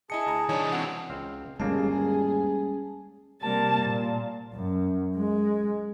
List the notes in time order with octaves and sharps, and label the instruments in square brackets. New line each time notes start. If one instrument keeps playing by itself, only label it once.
[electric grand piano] E4 D#5 C#7 [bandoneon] G#4 [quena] A5
[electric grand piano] D2 A#5
[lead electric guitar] E3 D4 [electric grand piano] D#4 C#5
[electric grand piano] C4 F#4 F#5
[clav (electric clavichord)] C#2 C4 F5
[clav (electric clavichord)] G1 D#2 A#3 [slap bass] G3 G#3 [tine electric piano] C#4 A5 [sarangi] G#4
[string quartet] C3 G3 A#3 A#4 A5
A#2
[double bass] F#2
G#3